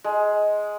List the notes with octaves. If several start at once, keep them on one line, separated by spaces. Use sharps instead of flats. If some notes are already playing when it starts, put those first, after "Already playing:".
G#3